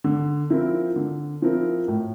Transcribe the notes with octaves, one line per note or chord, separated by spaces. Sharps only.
D3
F3 C4 E4 A#4
D3
F3 C4 E4 A#4
A2